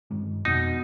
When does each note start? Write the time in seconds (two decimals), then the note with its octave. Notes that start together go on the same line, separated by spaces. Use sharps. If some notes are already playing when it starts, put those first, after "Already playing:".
0.11 G2 D#3 G#3
0.45 F2 B2 D#4